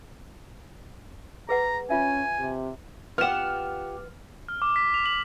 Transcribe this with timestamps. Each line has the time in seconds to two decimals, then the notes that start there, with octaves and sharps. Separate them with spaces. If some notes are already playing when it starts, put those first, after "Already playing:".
1.49 G#4 B4 F#5 A#5
1.90 C#4 F4 E5 G#5
2.38 C3
3.18 B3 F4 G4 F#5 F6 E7
4.48 F6
4.62 D6
4.76 B6
4.94 F7
5.06 F#7